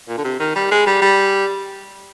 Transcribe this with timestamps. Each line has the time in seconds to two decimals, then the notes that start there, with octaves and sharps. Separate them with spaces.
0.08 A#2
0.17 D3
0.24 C3
0.40 D#3
0.55 G3
0.71 G#3
0.87 G3
1.02 G3